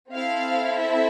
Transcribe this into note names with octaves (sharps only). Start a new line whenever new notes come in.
C4 E4 A4 F5
E5